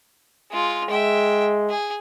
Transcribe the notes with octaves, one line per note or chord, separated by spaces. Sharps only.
G#3 F4
G#3 E5 G5
G#4